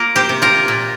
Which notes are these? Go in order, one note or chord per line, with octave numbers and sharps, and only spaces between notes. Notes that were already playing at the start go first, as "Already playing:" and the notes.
Already playing: A#3 F4 A#4
G4 C5
C3
F4 A#4
A#2